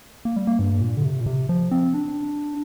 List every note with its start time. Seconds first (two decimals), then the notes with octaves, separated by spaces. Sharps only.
0.25 A#3
0.36 G3
0.47 A#3
0.59 G2
0.81 A#2
0.97 D3
1.05 C3
1.21 A#2
1.26 C3
1.49 F3
1.71 C4
1.94 D4